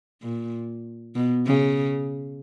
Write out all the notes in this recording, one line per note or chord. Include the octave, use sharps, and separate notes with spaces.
A#2
B2
C#3